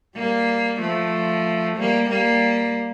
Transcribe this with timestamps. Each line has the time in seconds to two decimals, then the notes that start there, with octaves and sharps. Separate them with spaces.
0.17 G3 A#3
0.81 F3 A3
1.77 G3 A#3
2.10 G3 A#3